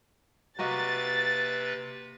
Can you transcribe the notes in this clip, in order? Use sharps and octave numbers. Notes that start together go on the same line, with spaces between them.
C3 A#3 F#4 B4 D#5 A6